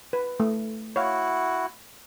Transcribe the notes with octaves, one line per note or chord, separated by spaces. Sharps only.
B4
A3
E4 F#4 C#5 F5